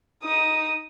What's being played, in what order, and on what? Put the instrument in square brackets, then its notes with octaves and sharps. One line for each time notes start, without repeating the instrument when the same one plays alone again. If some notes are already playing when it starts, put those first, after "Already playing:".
[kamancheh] D#4 D#6